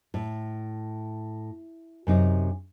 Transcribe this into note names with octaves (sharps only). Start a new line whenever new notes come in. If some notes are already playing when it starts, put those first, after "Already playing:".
A2
F#2 C3 D#4